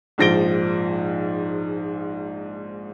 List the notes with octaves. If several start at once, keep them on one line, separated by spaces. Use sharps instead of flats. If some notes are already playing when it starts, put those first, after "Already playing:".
A#1 G#2 F3 A#6 D7 G7